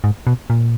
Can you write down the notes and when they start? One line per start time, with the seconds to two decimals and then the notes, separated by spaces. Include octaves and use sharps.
0.04 G#2
0.27 B2
0.50 A#2